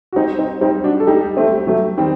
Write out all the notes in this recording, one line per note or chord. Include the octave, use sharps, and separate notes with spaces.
F#4
G3 C4 D#4
C4 D#4
G3 C4 D#4
D4 F#4
A4
G3 D#4 G4
A3 C4
G4
F#3 A3
D#3 G3 C4